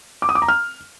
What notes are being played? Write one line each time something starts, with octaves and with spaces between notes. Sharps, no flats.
D6
D#6
D6
A#5
F6